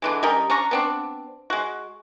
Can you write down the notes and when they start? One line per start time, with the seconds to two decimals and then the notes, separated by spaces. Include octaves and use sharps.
0.02 D3 E3 G#3
0.23 G3 C#4 A#4 D#5
0.50 C#4 D4 A#5 C#6
0.71 B3 C4 D4
1.50 G#3 F#4